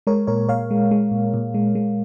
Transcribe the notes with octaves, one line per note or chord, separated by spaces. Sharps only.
G#3 A#4 C#5
A#2 A#4 C#5
A#2 C#5 F5
G#3
G#3
A#2
A#2
G#3
G#3